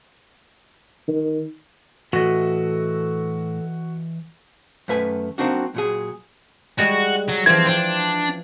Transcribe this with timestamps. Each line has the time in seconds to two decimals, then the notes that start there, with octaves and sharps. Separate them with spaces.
1.08 D#3
2.13 A2 E3 F#4 A4 D#5
4.88 F#2 D#3 A3 B4 G#5
5.38 F#3 A#3 C4 D4 D#4 F#4
5.75 A#2 F#3 G#4
6.79 G3 G#3 F#4
7.28 F#3
7.46 E3 F3 C4 G#6
7.66 D4 C5 G5